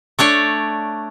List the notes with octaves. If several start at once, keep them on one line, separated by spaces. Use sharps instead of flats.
A3 D4 C#5 D5